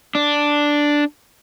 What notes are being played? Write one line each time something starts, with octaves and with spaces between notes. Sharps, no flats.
D4